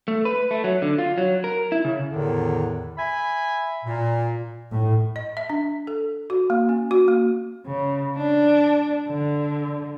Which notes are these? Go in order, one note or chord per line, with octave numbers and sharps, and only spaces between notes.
A3
B4
A3
F#3
D3
F4
F#3
A#4
E4
C#3
E2 A2 D3 D#3
E5 G#5 B5
A#2
A2
D#5
E5
D4
A4
F#4
A#3
C#4
F#4
A#3
C#3
D4
D3